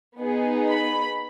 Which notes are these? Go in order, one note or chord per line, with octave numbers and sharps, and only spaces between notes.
B3 D#4 G#4
B5